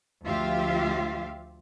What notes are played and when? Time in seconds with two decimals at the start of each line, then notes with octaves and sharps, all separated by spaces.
0.25 D2 F3 F4 G4 E5 F5